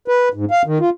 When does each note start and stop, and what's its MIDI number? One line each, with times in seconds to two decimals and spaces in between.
0.08 0.29 71
0.34 0.45 44
0.51 0.62 77
0.66 0.78 51
0.80 0.90 65